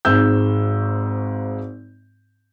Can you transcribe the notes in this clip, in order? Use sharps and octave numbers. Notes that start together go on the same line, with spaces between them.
G#1 G#2 E6 G6